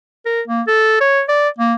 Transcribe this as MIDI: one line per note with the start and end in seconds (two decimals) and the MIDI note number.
0.26 0.41 70
0.48 0.62 58
0.67 0.97 69
1.00 1.22 73
1.28 1.48 74
1.58 1.74 58